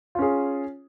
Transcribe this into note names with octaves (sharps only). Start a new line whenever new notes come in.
C#4 F4 G#4